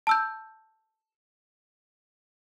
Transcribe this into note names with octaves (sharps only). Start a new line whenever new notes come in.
A5 E6 G6